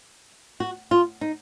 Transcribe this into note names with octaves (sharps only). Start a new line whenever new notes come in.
F#4
F4
D#4